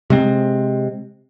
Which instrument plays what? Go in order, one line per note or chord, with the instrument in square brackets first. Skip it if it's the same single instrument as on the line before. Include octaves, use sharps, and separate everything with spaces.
[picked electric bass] C3 G#3 C4